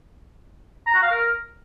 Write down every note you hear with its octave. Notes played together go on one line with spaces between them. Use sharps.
A#5
F#4
F5
A#4